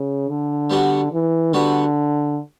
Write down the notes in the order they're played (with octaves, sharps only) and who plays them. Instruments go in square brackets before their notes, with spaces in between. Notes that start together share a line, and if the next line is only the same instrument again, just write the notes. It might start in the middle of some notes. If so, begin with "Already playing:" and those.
Already playing: [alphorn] C#3
D3
[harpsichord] G3 B3 D4 F#4
[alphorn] E3
[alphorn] D3 [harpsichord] G3 B3 F#4 B4